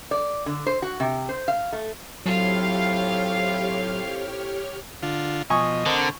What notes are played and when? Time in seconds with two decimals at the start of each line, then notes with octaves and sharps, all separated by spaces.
0.11 D5
0.46 D3
0.66 C5
0.82 F#4
1.00 C3
1.29 C5
1.48 F5
1.72 A3
2.26 A2 F#3 C4 F4 G4 C#5 F5 F6
5.02 D3 F4
5.50 B2 F3 D#5 G#5 C#6 D#6
5.86 D3 C4 A#4